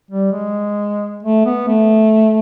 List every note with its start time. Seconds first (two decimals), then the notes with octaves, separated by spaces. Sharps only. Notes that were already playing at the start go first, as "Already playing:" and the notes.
0.11 G3
0.32 G#3
1.23 A3
1.46 B3
1.68 A3